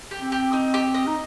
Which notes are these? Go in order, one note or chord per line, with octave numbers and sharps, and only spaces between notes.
G4
C4
G4
D#4
G4
D#5
D#4